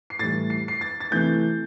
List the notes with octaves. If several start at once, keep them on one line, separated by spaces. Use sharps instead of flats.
C7
A2 E3 G3 A6
C7
C7
A6
A6
C3 E3 A3 G6